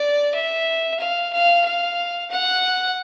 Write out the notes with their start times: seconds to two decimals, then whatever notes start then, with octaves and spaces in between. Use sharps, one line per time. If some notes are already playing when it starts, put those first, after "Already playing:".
Already playing: D5
0.34 E5
1.00 F5
1.33 F5
1.65 F5
2.31 F#5